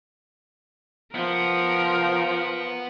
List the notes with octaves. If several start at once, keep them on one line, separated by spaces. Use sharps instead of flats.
F3 B3 A#4